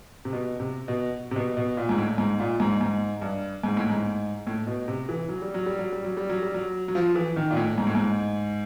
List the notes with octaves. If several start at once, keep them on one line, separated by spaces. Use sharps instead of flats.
C3
B2
C3
B2
C3
B2
B2
A#2
G#2
A2
G#2
A#2
G#2
G#2
G2
G#2
A2
G#2
A2
B2
C3
E3
F#3
G3
F#3
G3
F#3
G3
F#3
G3
F#3
G3
F#3
F#3
F3
E3
D#3
A#2
A2
G#2
A2
G#2